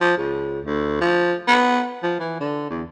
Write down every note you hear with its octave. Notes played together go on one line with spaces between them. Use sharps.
F3
C#2
D2
F3
B3
F3
E3
D3
E2